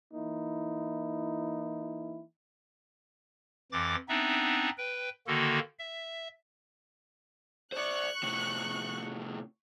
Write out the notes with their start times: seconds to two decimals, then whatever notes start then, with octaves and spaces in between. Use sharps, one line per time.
0.13 E3 A#3 D#4 E4
3.72 F2 E3 D6 A6
4.09 B3 C4 D4 D#4 E5
4.78 B4 G5
5.27 D3 D#3 A#3 F#4 A4
5.79 E5
7.72 C5 D5 C#6 F#6
8.23 A2 C3